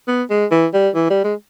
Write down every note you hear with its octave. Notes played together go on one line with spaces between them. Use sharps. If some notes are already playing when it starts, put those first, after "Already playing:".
B3
G#3
E3
G3
E3
G3
G#3